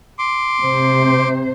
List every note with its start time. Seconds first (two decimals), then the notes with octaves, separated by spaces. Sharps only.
0.19 C6 D6
0.61 C3 C5